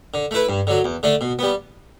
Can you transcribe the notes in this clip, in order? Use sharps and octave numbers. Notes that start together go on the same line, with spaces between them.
D3
A3 E4 B4
G2
D3 F#3
E2
D3 A3 D4
B2
G3 B3